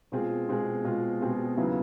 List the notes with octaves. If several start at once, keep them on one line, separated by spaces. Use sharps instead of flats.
B2 G#3 C4 F4 G#4
B2 G#3 C4 F4 G#4
B2 G#3 C4 F4 G#4
B2 G#3 C4 F4 G#4
D#2 C#3 F#3 B3 E4